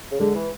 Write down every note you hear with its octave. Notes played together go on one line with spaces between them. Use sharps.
C#3
D3 G#3
E3